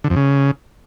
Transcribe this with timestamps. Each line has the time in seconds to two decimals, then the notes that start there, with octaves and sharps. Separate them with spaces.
0.04 D3
0.10 F2
0.16 C#3